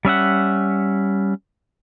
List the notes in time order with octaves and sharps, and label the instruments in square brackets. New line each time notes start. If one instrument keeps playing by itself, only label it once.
[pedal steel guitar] G3 C#4 E5 F#5